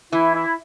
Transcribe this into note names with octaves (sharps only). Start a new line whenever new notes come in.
E3 E4
E4